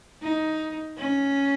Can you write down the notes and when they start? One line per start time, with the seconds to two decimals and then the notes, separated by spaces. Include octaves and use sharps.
0.22 D#4
0.98 C#4